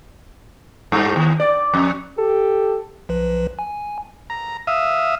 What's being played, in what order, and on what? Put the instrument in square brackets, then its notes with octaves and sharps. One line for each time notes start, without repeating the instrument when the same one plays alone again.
[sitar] G2
D#2
D5
F2
[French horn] G4 [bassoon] A4
[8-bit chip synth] B1 F3 B4
G#5
[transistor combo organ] A#5
E5 F5 D#6